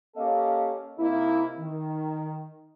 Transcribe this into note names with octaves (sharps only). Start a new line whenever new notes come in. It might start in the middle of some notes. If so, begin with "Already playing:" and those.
A#3 C#4 G4 A4 D#5 F5
C3 A#3 D#4 E4
D#3